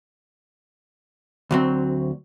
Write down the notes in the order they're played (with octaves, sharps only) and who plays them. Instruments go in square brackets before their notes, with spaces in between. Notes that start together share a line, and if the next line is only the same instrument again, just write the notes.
[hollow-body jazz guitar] D2 F#3 C4